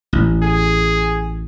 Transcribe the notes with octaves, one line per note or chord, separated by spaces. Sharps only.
A1
G#4